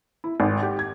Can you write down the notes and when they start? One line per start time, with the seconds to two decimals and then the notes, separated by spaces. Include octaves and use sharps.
0.24 E4
0.40 G#1
0.63 G4
0.79 G#6